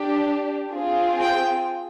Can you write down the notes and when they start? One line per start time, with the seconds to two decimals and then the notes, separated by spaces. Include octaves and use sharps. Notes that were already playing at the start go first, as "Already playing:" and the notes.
Already playing: D4 G4
0.72 C4 F4 G#4
1.21 G5